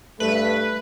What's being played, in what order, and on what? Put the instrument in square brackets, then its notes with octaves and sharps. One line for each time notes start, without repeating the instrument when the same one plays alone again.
[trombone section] G2 A3 [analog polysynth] B4